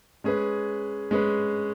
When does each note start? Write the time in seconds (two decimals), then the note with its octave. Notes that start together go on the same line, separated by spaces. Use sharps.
0.24 G#3 C#4 G#4 B4
1.11 G#3 C#4 G#4 B4